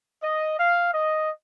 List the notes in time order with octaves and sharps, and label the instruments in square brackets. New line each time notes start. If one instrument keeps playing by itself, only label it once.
[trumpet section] D#5
F5
D#5